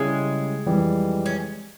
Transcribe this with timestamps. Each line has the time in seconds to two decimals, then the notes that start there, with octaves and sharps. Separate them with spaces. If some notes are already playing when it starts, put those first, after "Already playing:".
Already playing: C#3 G3 G#3 C#4 E4
0.66 F2 E3 G3
1.26 C#4